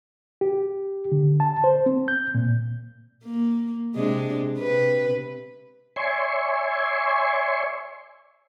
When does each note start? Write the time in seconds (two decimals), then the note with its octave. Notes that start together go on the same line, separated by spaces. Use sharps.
0.41 G4
1.12 D3
1.40 A5
1.64 C5
1.86 C4
2.08 G6
2.35 A#2
3.24 A#3
3.95 C3 G#3 D4
4.58 C3 B4
5.96 C#5 D5 E5 G#5 C6 C#6